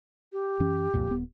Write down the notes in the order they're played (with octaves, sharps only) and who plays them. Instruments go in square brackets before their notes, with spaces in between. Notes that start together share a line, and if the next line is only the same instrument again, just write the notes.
[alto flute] G4
[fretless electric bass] F#2 E3 C#4
C2 F2 A#2
D#1 B3